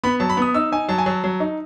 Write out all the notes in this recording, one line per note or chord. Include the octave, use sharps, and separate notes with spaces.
B3 B5
F#3 A5
B5
B3 D#6
D#4 E6
D#4 G#5
F#3 A5
G#5
F#3 A5
F#3
D#4